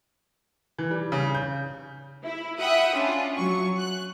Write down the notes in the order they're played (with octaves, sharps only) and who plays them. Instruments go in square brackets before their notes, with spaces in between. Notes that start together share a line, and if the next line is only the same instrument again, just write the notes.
[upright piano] E3
G3
C#3
G6
[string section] E4
E5 F#5 G5 B5 D#6
C#4 D4 F4
F#3 C#6
F#6